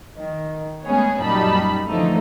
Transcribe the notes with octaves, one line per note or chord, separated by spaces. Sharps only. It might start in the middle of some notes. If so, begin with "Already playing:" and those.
D#3
G#3 A3 B3 C#4 G#4 C#5
F#2 A#2 G3 D#4 A5 B5
D3 E3 F3 A3 D#4